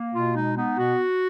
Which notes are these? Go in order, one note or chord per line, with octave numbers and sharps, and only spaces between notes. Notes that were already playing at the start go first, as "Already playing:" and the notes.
Already playing: A#3
B2 F4
G#3 D#4
B3 D#4
B2 F#4